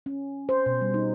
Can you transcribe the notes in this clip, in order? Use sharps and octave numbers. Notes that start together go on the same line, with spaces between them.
C#4
C5
B2
G3
D#4